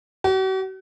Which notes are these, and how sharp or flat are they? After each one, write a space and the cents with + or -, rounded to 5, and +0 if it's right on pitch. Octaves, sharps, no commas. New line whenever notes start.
F#4 +45